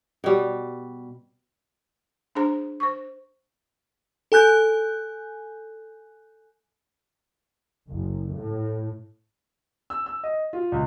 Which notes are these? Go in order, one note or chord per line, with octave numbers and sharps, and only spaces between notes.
B2 G3
D4 G#4 C5 A#5
C5 C#6
A4 G#5 F#6 G6
F#1
A2
E6
E6
D#5
F4
C#2